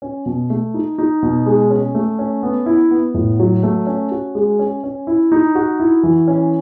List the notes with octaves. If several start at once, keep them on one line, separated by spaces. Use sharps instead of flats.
C#4
B2
A3
D#4
D#4
B2
G#3
C#4
A3
C#4
B3
E4
B3
A2
F#3
A3
C#4
F#4
G#3
C#4
C#4
E4
D#4
F#4
E4
E3
C#4